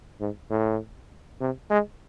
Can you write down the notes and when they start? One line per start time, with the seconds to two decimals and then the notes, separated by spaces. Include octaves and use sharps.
0.20 G#2
0.50 A2
1.41 C3
1.70 G#3